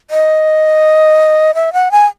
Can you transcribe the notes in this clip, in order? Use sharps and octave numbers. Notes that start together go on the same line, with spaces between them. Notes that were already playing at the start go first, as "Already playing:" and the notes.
D#5
E5
F#5
G#5